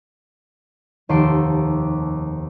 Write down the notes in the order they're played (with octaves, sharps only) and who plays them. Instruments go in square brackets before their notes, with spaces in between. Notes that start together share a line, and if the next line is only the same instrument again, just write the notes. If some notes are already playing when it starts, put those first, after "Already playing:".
[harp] F1 D#2 A4 C6 E6 D7